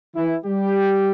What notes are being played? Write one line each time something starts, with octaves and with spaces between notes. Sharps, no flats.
E3 E4
G3 G4